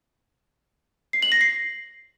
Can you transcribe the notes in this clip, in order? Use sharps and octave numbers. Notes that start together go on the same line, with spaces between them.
C7
F#7
A#6
C7